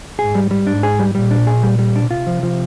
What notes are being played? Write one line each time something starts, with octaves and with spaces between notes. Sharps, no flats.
G#2 G#4
G3
G3
G#2 D4
G#4
G3
A#2 G3
D4
G#4
G3
G3
D4
C3 F4
F3
F3